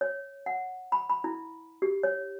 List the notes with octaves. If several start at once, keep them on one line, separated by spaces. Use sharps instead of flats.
C#5
F#5
B5
B5
E4
G4
C#5